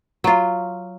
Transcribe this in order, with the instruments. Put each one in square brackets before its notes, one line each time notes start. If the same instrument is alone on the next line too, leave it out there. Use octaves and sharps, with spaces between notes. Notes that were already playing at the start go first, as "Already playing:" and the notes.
[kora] F#3 F4